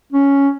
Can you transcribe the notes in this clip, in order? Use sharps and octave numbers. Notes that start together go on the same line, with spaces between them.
C#4